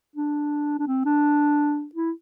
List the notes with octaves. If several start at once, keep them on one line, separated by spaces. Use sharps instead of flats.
D4
D4
C4
D4
E4